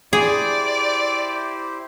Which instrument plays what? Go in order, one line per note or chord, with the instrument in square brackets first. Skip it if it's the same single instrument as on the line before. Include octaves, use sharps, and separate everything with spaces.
[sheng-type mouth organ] E4 G4 C5 [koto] G#4 [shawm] D5